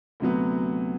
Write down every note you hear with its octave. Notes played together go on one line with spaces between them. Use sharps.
D2 C3 F#3 B3